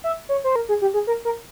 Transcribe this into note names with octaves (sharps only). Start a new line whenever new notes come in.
E5
C#5
C5
A#4
G#4
G4
G#4
A#4
A#4